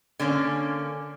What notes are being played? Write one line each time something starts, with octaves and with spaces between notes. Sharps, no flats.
D3 A#3 C#4